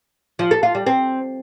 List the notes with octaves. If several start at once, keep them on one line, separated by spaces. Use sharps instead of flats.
F3
A4
F4
G3
C4